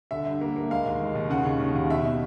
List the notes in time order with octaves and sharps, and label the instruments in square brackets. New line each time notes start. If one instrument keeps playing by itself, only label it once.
[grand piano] D3 E5
G2
A#3
A#3
G#3 F5
D#2
G#3
D#2
C#3 F#5
C#3
D#2
D#2
B2 E5